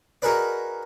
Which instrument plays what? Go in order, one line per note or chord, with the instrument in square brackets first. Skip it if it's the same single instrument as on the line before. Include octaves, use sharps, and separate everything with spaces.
[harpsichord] D#4 F#4 G#4 A#4 B4 D5